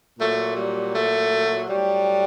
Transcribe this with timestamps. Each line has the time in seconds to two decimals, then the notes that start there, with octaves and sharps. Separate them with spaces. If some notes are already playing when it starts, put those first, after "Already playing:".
0.20 A#2 F#3 A3
0.56 G3
0.94 A3
1.69 A2 F#3 G3